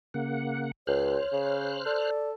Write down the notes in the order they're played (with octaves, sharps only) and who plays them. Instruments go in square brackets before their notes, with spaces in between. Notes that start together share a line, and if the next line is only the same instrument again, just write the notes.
[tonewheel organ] C#3 A#3 F#5
[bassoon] C#2 [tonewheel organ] C5 F6 F#6 [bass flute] C#5
[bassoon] C#3
[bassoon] A4 [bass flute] D5